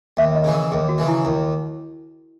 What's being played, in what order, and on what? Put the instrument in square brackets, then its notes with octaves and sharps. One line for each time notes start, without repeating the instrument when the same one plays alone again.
[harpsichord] D#2 [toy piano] E5
[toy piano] D#5
[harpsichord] C#3 E3
[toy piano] A#4
[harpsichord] D#2 [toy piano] G#4
[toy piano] F#4
[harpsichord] C#3 E3
[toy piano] E4
[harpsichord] D#2 [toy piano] E4